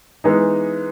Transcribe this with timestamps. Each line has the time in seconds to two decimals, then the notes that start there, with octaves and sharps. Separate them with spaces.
0.24 E3 G#3 B3 D#4